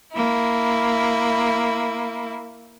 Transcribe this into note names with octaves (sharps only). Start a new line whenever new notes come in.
A#3 E4